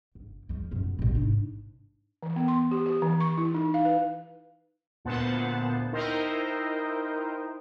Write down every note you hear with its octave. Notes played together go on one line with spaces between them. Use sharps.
G1
F3 G#3
F#2 B2
A1 B2
G#2 D4
E3
B3
C6
G4
G4
E3
C#6
E4
D#4
F5
B4
D2 A#2 B3 C5 F#5 A5
D#4 E4 A#4 C5 D#5 G5